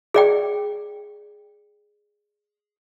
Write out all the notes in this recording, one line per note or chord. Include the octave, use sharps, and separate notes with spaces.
G#4 D5 G5